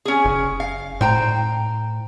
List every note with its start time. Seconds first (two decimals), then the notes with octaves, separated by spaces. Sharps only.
0.05 C#4 G#4
0.25 F#1
0.60 F5
1.01 A2 C5 G5 A#5